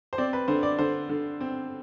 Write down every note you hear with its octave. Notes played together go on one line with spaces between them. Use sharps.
C5
C4 D5
B4
D3 C5
D5
D3 C5
D3
C4